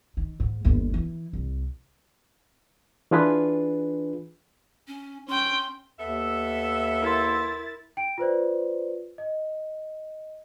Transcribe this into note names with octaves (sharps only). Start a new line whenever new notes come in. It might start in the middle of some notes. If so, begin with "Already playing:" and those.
D#3
G#2
G1 D#2
E3
C2
E3 D4 F4 G#4 B4
C#4
C#4 G5 C6
D#2 B3 A4 E5
E4 A#4 C6 A6
G5 D7
F4 B4 C5 D5
D#5